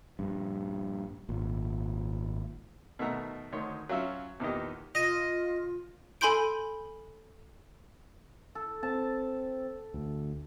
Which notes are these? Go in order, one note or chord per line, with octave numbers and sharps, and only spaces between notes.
A#1 G2
G#1 A#2
B2 D#3 A3 E5 F#5 A#5
D2 D#3 C#5 C6
F#3 C#4 F4 E5
E2 A#2 D#3 B3 G4 D#5
F4 D#5
A4 G#5 B5 C6 G6 D7
A4
C4 A5
D2